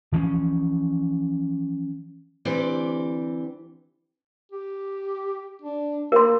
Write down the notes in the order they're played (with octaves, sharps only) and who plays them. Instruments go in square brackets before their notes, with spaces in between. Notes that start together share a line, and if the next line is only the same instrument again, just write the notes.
[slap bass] E3 F3 B3 C#4
[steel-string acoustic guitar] D2 E3 C4 G4 D5
[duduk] G4
D4
[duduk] A#3 [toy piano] A#4 C6